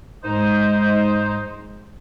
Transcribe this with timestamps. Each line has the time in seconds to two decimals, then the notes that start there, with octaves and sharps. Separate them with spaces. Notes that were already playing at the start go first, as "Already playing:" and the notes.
0.24 G#2 G#3 D#4 C5